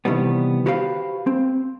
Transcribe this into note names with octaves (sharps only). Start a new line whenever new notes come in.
C3 D#3 E3 G3 B3
F#4 G4 B4 C5 D#5 F5
C4